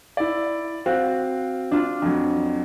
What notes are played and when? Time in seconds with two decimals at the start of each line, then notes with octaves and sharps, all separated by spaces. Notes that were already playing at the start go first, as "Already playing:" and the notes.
0.17 E4 D5
0.86 C4 F#4 F5
1.71 D4 F4
2.02 F2 F#3